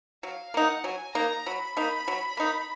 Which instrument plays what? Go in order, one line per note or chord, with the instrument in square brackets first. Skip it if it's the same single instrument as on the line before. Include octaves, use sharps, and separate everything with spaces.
[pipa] F#3 [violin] F5
[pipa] A#3 D#4 [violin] F#5
[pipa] F#3 [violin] G#5
[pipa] A#3 D#4 [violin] A#5
[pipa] F#3 [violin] B5
[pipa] A#3 D#4
F#3
A#3 D#4